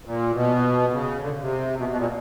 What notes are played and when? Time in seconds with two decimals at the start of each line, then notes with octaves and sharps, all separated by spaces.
0.06 A#2
0.34 B2
0.92 C#3
1.21 D3
1.40 C3
1.78 B2
1.89 B2
1.97 A#2